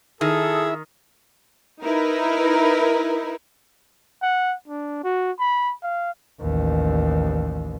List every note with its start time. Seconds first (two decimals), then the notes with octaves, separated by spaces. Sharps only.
0.21 D#3 E4 G#4 A4 E5
1.83 D#4 E4 A#4 B4
4.23 F#5
4.68 D4
5.04 F#4
5.39 B5
5.83 F5
6.41 A1 D#2